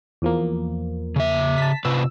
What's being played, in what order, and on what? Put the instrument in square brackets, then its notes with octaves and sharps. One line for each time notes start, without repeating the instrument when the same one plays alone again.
[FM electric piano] E2 F3 A#3
[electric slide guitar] C#3 E5
[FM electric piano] A5 B6
[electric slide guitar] C3 F4 B4 [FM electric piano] E6